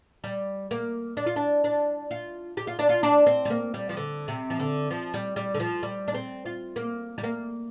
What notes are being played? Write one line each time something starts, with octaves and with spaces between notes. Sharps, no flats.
G3
A#3
D4
F4
D4
D4
F4
G4
F4
D4
F4
D4
C4
G3
A#3
G3
F3
D3
C3
F3
D3
F3
G3
G3
D3
F3
G3
D4
C4
F4
A#3
G3
A#3